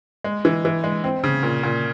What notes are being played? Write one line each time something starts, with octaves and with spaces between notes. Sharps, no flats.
G#3
E3
E3
G#3
C4
C#3
A#2
A#2